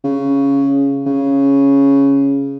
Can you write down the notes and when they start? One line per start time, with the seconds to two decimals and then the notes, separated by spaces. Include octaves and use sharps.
0.04 C#3
1.06 C#3